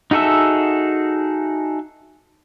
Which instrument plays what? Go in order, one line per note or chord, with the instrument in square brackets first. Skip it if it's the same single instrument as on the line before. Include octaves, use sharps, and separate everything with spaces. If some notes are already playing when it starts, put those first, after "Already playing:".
[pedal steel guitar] D#4 F#4 G#4 A4 E5